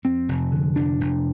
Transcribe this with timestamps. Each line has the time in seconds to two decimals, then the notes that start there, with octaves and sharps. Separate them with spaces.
0.05 F2 C4
0.29 F1
0.52 D3
0.76 F1 D4
1.00 F1